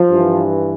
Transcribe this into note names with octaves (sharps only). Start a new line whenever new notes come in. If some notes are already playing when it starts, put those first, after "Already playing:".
Already playing: F3
G2 E3